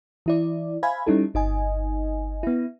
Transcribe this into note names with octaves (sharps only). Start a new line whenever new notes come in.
E3 E4 D5
C5 E5 F5 G#5 B5 G#6
G3 C#4 D#4 E4 A4
G1 D#4 D#5 G#5
B3 E4